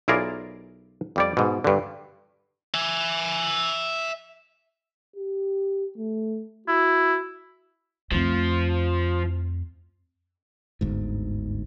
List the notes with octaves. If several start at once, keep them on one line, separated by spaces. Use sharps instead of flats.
B1 E4 F4 G#4 A#4 D5
F2 G3 D5
G#2 B2
G2 D3
E5 G#5
G4
A3
E4 F#4
F2 F3 A3
G1 D2 G#2